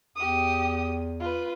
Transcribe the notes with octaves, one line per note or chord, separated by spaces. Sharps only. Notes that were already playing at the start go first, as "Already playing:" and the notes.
E2 G4 D#6
F4 B4